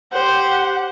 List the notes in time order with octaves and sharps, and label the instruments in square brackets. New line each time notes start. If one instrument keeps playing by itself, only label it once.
[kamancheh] G4 F#5 [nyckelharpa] C5